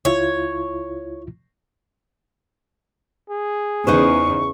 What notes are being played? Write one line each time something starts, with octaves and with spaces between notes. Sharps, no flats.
C#2 E4 F4 C#5
G#4
E2 C#3 D#4 B4 C5 C#6